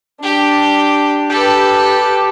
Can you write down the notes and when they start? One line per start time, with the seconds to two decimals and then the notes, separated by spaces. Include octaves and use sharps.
0.23 D4 G4
1.30 G4 A4 B4